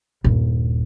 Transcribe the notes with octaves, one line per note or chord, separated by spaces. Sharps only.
D#1 G2